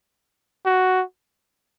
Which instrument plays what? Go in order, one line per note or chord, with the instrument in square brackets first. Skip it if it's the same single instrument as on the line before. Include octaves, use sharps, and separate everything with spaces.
[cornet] F#4